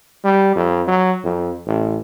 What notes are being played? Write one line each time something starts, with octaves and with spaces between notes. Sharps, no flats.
G3
F2
F#3
F2
A1